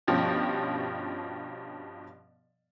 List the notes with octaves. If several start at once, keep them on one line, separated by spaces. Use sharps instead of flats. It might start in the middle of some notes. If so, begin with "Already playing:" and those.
G2 B2 F3 C#4 G4